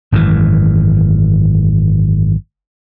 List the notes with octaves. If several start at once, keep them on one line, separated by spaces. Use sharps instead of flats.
G#1 F#2 D3 E3